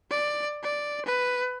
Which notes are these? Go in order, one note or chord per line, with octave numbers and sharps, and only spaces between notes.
D5
D5
B4